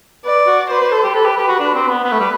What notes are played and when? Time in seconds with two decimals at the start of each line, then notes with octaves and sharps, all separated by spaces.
0.25 B4 D5
0.47 F#4
0.70 B4 C5
0.81 B4
0.92 A4
1.03 G4
1.15 A4 B4
1.26 G4
1.37 G4
1.48 F#4
1.60 D4
1.74 C4
1.89 B3
2.03 B3 B4
2.12 A3
2.20 G3